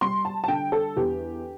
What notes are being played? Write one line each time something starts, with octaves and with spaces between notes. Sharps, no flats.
G3 C6
A5
A5
D3 G5
A4
E2 G4